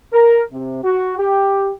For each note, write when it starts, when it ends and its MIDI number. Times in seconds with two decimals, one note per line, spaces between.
0.13 0.41 70
0.51 0.79 48
0.83 1.17 66
1.18 1.70 67